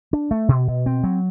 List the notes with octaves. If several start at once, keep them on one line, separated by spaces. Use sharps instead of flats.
D4
A3
B2
B2
C4
F#3